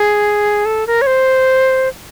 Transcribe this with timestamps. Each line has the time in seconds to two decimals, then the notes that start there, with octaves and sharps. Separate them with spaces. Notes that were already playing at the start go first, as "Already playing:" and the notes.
Already playing: G#4
0.66 A4
0.87 A#4
1.02 C#5
1.07 C5